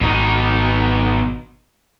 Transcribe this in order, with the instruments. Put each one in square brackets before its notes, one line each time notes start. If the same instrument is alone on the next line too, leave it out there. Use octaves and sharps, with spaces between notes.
[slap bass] G#1 [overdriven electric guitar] B2 D#4